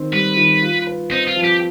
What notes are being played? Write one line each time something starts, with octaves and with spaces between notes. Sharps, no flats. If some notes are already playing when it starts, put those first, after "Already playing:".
Already playing: D#3 C4
G3 B4
D#3
F4
B4
C4 D#4
F4
F3
G4